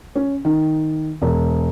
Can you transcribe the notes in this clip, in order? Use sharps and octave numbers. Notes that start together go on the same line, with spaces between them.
C#4
D#3
E1